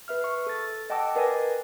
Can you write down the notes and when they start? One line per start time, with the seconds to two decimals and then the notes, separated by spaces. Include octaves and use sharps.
0.08 B4 E5 F6
0.24 C#6
0.47 A4 A6
0.90 D#5 F#5 G5 A5 D6 E6
1.15 A#4 B4 D5 D#5 G#5